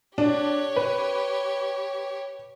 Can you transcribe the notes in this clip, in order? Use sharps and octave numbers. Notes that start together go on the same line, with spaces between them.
D4 G4 C#5
B4